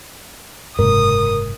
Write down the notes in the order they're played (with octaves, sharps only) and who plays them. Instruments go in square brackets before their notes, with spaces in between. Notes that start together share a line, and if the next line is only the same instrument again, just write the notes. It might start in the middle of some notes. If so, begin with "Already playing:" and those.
[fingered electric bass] F#1 G#2 C3 [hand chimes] A#4 [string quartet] D#6